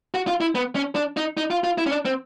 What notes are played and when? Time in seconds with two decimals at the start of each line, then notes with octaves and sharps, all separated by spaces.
0.14 F#4
0.27 F4
0.41 E4
0.55 B3
0.75 C#4
0.95 D4
1.17 D#4
1.37 D#4
1.51 F4
1.64 F4
1.78 E4
1.86 C#4
1.91 D4
2.05 C4